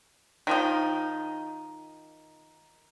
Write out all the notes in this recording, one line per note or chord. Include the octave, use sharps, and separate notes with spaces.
D#3 F3 D#4